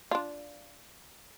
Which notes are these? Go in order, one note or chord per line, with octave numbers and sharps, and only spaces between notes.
D4 F4